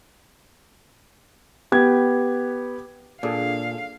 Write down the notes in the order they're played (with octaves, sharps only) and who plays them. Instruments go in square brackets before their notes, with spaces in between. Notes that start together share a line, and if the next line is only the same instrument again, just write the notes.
[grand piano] B3 G4 G#6
[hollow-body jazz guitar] A#2 [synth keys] D4 G#4 A4 [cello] F5